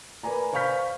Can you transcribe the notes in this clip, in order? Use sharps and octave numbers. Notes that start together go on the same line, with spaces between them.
A#4 B4 D5 G#5 A#5
C5 F5 C#6 F6 G6 B6